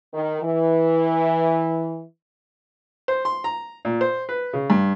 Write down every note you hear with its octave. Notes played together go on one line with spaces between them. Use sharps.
D#3
E3
C5
C6
A#5
A#2
C5
B4
C#3
G2